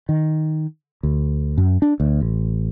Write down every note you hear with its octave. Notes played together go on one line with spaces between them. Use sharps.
D#3
D2
F#2
D4
D2
A1